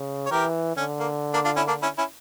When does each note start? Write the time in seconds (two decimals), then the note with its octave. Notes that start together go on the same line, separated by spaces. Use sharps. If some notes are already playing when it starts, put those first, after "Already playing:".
Already playing: C#3
0.26 C#5
0.31 E3 G4 A#4
0.77 D3 C#4
1.00 A#3
1.34 A#3 D4
1.45 D4 F4
1.56 C#4 E4
1.68 A#3 D4
1.83 C#4 E4
1.98 C#4 E4